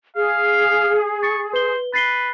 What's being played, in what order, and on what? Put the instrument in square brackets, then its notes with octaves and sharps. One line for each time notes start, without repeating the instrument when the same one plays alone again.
[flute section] G#4 [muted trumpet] F5
[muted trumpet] C#6 [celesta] A6
[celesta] B4 G7 [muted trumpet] C5
[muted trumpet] B4 [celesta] A6 C7 G7